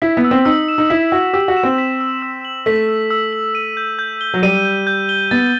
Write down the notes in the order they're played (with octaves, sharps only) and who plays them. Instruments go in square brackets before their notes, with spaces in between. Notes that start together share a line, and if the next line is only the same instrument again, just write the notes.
[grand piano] E4 [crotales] B6
[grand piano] B3
[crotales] E6
[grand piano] C4
[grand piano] D#4 [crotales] E6
[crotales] E7
[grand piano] D#4
[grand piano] E4 [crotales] B6
[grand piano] F#4 [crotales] E6
[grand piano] G4 [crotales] E6
[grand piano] F#4
[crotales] E7
[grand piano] C4
[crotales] B6
E6
E6
F#7
[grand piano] A3 [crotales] B6
[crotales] E6
E6
F#7
D#7
G6
G6
G7
[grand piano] F#3
[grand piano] G3 [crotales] D#7
[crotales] G6
G6
G7
[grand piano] B3 [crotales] A6